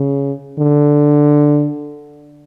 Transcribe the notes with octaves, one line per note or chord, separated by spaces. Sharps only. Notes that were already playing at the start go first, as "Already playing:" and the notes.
Already playing: C#3
D3